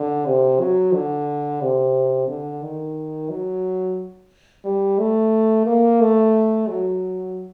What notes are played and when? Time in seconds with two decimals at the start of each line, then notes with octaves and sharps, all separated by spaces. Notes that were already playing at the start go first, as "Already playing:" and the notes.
Already playing: D3
0.26 C3
0.60 F#3
0.94 D3
1.62 C3
2.28 D3
2.63 D#3
3.29 F#3
4.65 G3
4.99 A3
5.66 A#3
6.01 A3
6.68 F#3